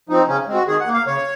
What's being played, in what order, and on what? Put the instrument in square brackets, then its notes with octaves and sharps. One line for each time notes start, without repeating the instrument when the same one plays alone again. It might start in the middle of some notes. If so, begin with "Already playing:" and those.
[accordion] F3 C4 D#4
C#3 C#4
G#3 C4
F#4
D#3 G#4
F#5
A#3
F5
C#3 C#5